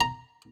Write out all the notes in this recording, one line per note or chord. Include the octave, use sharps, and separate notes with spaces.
A#5